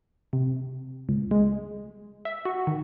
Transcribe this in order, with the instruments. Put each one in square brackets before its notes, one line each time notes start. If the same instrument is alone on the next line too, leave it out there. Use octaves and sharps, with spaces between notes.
[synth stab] C3
C#2
G#3
E5
F#4
D#3